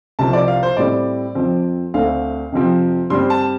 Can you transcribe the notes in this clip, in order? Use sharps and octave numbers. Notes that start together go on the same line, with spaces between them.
C2 C3 F3 C4 A5
D5
F5
C5
A2 G3 C4 D5
F2 F3 C4
D2 D3 A3 C4 F5
F2 C3 F3 C4
G2 G3 C4 C6
A5